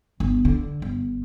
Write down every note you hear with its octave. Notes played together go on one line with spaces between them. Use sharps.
G1
D3
G1